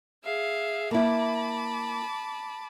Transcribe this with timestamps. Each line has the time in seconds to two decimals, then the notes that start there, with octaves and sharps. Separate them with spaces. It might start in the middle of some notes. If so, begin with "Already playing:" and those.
0.22 G#4 E5 F5
0.91 A#3 E4 A5 B5 D6